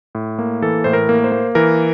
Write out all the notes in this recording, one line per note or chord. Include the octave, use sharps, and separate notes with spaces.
A2
A#3
E3 A4
A2 C5
A#4
A#3
C5
A#3
E3 A#4